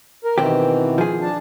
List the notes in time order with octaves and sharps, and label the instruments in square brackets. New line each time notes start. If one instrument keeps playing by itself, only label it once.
[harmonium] A#4
[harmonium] B2 D#3 E3 [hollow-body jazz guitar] C4 G4
[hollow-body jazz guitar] F3 G#4
[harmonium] D4 A5